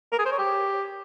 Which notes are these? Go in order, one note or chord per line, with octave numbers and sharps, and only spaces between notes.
A#4
G#4
C5
C#5
G4